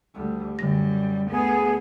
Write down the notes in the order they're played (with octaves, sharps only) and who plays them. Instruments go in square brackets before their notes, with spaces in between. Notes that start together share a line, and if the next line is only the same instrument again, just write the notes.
[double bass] D2 G3
[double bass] F#2 [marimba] D3 A#6 [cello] G3
[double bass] D2 [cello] B3 [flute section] G#4